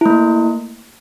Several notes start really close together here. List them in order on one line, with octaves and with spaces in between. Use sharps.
E4 A3 A#3